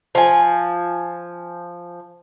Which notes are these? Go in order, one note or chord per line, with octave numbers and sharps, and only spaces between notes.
F3 G#5